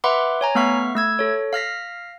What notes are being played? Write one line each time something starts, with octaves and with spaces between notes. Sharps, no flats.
B4 E5 F#5 B5 C6 D6
C#5 G#5 A#5
A3 B3 F5 C#6 F6 B6
A3 E6 G#6
A4 C#5
F5 F6 A#6 B6